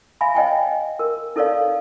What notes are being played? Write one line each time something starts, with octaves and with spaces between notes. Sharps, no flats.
E5 F5 G#5 B5
C#5 D#5 G5 G#5
A#4
D#4 A4 A#4 C#5 D5 F5